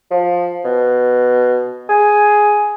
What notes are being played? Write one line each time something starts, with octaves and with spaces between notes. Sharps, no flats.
F3
B2
G#4